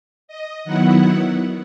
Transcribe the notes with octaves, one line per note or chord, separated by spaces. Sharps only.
D#5
D#3 F#3 B3 E4 F#5